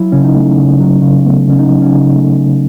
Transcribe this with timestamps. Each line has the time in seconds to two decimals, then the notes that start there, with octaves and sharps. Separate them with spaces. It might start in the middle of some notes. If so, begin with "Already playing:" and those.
Already playing: F#3 E4
0.12 C#3 C#4
0.24 D#4
0.35 A3
0.58 C#3
0.80 F#3
1.03 C#3
1.26 A3 B3
1.48 C#3 C#4
1.59 D#4
1.70 F#3
1.82 C#4
1.94 C#3 D#4
2.16 A3
2.39 C#3